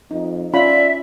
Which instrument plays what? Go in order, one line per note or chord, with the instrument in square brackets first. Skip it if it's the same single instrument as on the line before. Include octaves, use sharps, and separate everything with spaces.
[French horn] F2 [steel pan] D#4
[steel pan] C#4 F4 B5 [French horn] D5 [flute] E5